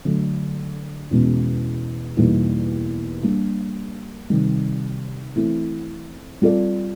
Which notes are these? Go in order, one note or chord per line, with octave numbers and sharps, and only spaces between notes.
D3 F#3 A3
E2 B2 G#3 C#4
E2 B2 G3 A#3 D#4
G3 A#3 D4
C3 D#3 G3
E3 A3 C4 E4
G3 C4 F4 A4 D5